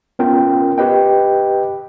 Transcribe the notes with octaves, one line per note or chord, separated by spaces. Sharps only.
B3 C#4 F4 A#4 G5
G4 B4 D#5 G5